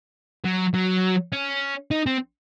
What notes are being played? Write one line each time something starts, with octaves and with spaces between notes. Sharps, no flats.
F#3
F#3
C#4
D#4
C4